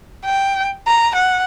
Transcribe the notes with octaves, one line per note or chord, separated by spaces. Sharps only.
G5
A#5
F#5